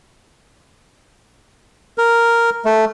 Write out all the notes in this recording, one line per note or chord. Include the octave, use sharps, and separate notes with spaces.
A#4
A3